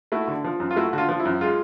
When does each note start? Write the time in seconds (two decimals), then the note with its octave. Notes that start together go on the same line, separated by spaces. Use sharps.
0.12 A3 E4 F#4
0.28 D3
0.44 F3
0.60 F#2
0.71 F4
0.76 A3 E4 F#4
0.93 D3 F#4
0.98 F4
1.09 F3
1.20 E4
1.26 F#2
1.41 G#3 F4